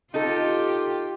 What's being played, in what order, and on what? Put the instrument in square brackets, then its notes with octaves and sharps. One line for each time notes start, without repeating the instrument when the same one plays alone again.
[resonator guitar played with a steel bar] D#4 A4 [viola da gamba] F4 G4